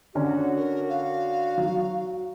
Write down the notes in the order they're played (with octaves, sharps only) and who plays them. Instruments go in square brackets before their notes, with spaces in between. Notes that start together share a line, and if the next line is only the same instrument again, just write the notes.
[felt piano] D3 C#4 [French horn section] F#4
[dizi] A#4
F5
[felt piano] F#3